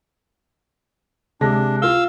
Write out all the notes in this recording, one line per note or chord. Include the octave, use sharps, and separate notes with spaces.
C3 G#3 D4 A#6
F4 F5 E6 G7